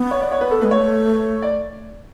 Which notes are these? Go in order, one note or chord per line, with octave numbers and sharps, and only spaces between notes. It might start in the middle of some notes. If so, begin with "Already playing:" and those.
Already playing: B3
C#5
D5
C#5
B4
A4
G#3 B4
A3 C#5
D5